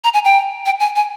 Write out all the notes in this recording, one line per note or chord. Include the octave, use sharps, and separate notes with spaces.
A#5
G#5
G5
G5
G#5
G#5